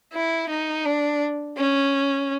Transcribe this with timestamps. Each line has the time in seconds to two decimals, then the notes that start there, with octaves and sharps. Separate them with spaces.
0.14 E4
0.49 D#4
0.85 D4
1.57 C#4